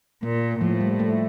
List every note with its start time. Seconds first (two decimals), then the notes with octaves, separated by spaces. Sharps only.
0.23 A#2 A#3
0.61 A2 F3
0.81 G3
0.99 A3